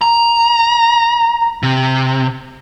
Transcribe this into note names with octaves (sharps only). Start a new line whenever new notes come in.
A#5
C3